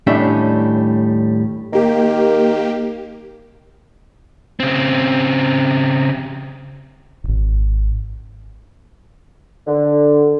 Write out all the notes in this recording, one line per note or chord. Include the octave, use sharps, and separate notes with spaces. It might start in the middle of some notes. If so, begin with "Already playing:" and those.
D#2 A2 G3 C#4 D4 E5
D#3 A#3 G4
C#3 C4
D#1 G#1
D3